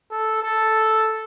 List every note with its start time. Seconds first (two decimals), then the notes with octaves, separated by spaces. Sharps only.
0.11 A4
0.43 A4